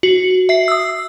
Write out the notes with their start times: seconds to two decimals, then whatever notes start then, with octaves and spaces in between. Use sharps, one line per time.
0.03 F#4
0.49 E5 C7
0.68 D#6 E6